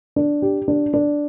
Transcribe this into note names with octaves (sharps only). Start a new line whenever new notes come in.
D4
G4
D4
D4